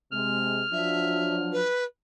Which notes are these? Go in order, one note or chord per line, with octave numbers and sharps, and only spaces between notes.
C3 G#3 F6
F3 F#3 D4 E5
B4